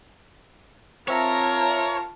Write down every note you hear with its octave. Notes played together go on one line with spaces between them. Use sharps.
C4 F4 A#4 C#5 E5 A5 A#5